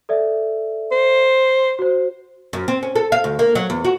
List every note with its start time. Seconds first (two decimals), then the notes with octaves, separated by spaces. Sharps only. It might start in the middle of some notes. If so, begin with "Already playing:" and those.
0.09 A4 D5 E5
0.92 C5
1.79 F#4 C5
2.53 F#2
2.68 C4
2.83 C#4
2.96 A4
3.12 F5
3.24 D2
3.39 A#3
3.55 F#3
3.70 E2
3.85 F#4